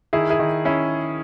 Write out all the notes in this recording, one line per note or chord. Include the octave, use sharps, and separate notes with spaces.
D#3 E4 G#4
E4 G#4
D#3
C#4 E4